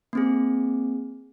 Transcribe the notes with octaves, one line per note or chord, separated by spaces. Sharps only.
A#3 C4 G#4